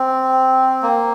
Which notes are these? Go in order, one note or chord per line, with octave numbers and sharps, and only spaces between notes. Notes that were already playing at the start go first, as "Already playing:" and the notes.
Already playing: C4
A#3